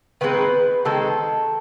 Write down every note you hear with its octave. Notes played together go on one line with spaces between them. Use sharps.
D#3 G#3 C4 B4
D#3 G#3 C4 A4